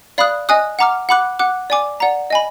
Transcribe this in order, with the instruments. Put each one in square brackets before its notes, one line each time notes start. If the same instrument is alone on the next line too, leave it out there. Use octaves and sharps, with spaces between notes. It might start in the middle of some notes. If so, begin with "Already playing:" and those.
[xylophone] D5 F5 B5 D#6 F#6
D#5 G#5 D#6 F#6
F#5 A#5 D6 F6
F#5 B5 D6 F#6
F#5 D6 F#6
D5 G#5 D6
D5 F#5 A#5
D#5 G#5 B5